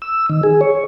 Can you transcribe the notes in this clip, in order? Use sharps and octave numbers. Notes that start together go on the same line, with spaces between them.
E6
D#3
G#4
C#5